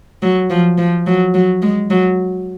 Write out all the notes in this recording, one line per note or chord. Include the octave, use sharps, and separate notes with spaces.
F#3
F3
F3
F#3
F#3
G#3
F#3